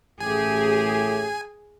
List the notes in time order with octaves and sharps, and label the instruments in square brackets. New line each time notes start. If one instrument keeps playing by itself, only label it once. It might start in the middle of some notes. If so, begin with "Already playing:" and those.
[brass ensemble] A1 A2 [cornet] G4 [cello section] G#4 [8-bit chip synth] G#5